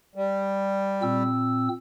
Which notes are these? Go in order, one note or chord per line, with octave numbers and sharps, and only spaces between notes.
G3
A#2 C4 E6